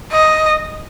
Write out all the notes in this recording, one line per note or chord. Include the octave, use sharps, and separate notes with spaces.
D#5